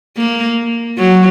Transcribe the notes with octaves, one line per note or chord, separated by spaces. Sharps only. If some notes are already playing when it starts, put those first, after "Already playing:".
A#3
F#3